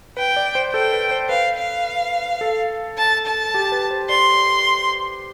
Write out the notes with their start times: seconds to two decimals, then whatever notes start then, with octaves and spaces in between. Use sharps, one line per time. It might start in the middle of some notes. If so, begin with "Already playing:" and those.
0.17 B4 G5
0.37 D5
0.55 C5
0.73 A4 G5
0.93 B4
1.11 C5
1.29 B4 F5
1.58 F5
2.41 A4
2.98 A5
3.26 A5
3.54 G4
3.72 B4
3.91 C5
4.09 D5 C6